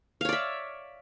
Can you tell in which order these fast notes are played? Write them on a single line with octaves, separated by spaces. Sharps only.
F5 C#5 D5 E5